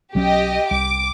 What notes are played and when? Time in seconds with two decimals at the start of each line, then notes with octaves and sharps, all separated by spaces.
0.15 B1 F#3 C#4 G4 D#5
0.71 C2 D6